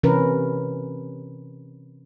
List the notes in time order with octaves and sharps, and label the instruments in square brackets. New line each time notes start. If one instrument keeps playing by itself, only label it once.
[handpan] C3 E3 C#4 A#4 B4